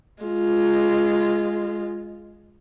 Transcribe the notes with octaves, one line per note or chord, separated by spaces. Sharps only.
G#3 F4